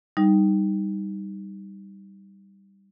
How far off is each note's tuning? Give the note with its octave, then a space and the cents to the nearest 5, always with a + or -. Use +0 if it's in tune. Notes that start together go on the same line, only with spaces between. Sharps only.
G3 +0 D#4 +0